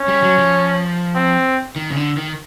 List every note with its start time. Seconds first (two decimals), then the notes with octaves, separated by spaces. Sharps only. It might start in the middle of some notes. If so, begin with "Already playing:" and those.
Already playing: C#4
0.08 G3
0.23 F#3
0.38 F3
1.15 C4
1.76 D#3
1.91 C#3
1.97 D3
2.17 D#3